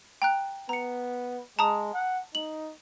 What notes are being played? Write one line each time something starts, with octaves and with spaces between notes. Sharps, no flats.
G5 A#5 F#6
B3 A#5 C#7
G#3 A5 A#5 D#6
F#5
D#4 F#7